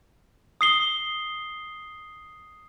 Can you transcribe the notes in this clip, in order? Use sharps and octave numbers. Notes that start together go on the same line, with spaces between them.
D#6 C7 G7